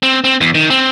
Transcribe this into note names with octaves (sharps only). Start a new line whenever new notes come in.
C4
C4
E2
D#3
C4